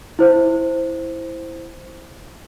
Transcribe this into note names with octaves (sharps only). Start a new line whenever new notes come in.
E4 C5